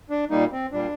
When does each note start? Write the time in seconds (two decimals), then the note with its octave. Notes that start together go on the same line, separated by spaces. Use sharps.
0.10 D4
0.30 A#2 G3 A#3 D#4
0.52 C4
0.72 A#2 G3 A#3 D4